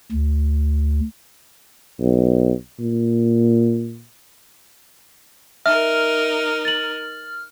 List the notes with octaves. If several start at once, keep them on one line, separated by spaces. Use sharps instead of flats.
D2
B1
A#2
D#4 A#4 E5 F6
A6 F#7